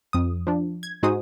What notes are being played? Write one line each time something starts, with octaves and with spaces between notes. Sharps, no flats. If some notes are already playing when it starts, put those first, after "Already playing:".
F2 D#6
F3 D4
G#6
G#2 D#4 F#4 G#4 C5 D#6